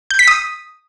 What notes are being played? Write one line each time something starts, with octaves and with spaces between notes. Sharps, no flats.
G6
B6
D#6